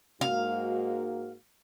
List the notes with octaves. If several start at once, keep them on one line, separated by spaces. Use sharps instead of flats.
G#2 A#3 F#4 F5